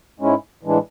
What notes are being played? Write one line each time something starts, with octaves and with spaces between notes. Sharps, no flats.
G#2 G#3 C#4 E4
A2 E3 G#3 D4